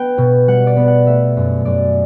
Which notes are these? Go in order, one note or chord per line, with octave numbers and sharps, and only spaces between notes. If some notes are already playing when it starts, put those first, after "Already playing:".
Already playing: B3 G5
B2
G3 F#5
D5
B3
F#5
A3 E5
F#2
F#2 D5